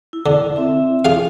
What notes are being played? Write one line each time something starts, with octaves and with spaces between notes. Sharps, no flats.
E4
D3
C4 E4 E5
F4 G#4 F5